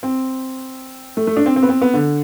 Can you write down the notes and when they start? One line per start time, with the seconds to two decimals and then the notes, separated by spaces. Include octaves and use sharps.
0.03 C4
1.17 A3
1.27 A3
1.37 D4
1.46 C4
1.56 C4
1.63 B3
1.69 C4
1.82 B3
1.94 D3